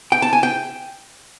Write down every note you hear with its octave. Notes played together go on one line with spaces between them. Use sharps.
G5
A5
G#5
G5